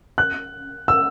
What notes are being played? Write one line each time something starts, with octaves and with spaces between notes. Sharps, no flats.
F#6
E6